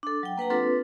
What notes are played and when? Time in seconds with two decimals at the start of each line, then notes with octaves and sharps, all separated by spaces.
0.03 D4 A4
0.23 F#3 G5
0.37 A#3 B4 F#5 A#5
0.50 C4 D4 F4 A4 B4